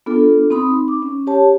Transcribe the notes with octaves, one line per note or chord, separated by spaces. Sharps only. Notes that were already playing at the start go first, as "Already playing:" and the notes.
B3 D4 F4 A4
C4 D#4 B5 D#6
D6
C#4
G4 C#5 A5